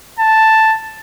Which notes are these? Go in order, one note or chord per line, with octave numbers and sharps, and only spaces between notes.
A5